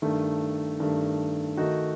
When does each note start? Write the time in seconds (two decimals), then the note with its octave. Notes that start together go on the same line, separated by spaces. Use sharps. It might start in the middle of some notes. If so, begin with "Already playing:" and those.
0.02 G2 D#3 A3
0.80 G2 D#3 A3
1.57 D#3 A3 D#4 F#4